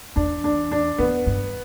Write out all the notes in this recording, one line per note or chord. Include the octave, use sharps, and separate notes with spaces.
E2 D4
D4
D4
E2 B3
G2